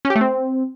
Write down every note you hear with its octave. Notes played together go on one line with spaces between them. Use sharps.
C#4
G4
A3
C4